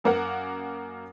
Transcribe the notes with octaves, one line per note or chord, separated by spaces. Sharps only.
F#2 A#3 A#4 F#5